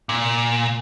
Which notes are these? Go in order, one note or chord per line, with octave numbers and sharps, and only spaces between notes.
A#2